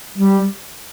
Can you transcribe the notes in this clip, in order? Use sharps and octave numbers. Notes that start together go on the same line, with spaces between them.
G3